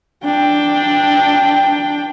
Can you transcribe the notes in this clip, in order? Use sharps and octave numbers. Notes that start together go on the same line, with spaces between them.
D4 G5